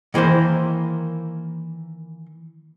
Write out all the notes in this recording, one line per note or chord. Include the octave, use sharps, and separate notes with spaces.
D#3 E3 A#3 A#4 C5